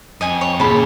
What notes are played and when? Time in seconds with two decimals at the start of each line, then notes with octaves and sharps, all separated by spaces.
0.21 F2 D#5 G#5
0.41 C#5
0.60 D#2 A#2 C#3 A5 B5